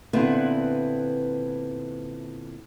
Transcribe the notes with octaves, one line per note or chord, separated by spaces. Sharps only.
A#2 D3 B3 C4 E4 B4